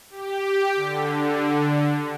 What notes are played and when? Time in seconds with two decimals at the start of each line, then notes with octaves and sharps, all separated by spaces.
0.10 G4
0.76 D3